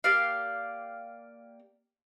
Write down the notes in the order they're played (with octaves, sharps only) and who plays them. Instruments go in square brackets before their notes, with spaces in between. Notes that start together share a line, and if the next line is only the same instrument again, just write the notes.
[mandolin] A#3 G4 D5 F5